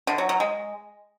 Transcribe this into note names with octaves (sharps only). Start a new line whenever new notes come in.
D3
F#3
F#3
G#3